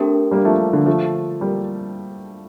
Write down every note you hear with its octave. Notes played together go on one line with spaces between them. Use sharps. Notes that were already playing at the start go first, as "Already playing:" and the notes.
Already playing: A3 C4 D4 G4 A#4
G3 A#3
F3 A3
D3 F3
F3 A3
G3 A#3